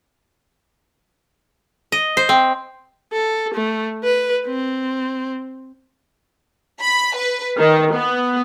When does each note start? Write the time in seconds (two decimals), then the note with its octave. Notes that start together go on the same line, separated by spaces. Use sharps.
1.92 D#5
2.17 C5
2.29 C4
3.13 A4
3.54 A3
4.04 B4
4.46 C4
6.81 B5
7.17 B4
7.58 D#3
7.93 B3